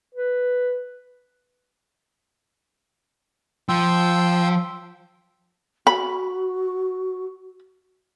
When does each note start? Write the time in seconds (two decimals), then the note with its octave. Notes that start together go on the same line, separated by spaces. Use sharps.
0.15 B4
3.69 F3 G5 C6 E6
5.87 F#4 B5